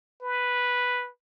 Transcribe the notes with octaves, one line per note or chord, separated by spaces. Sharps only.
B4